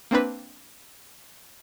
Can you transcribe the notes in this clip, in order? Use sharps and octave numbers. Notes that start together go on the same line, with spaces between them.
A#3 C4 D4 B4